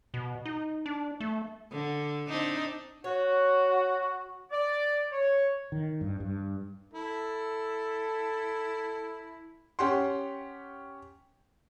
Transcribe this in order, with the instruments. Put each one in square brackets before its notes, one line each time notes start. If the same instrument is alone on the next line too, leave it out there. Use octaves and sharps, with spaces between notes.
[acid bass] B2
D#4
D4
A3
[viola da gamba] D3
C4 D4 D#4
[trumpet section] F#4 [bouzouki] C#5
[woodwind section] D5
C#5
[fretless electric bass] D#3
G2
G2
[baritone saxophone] E4 [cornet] A4
[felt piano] C#4 G4 F#5 C6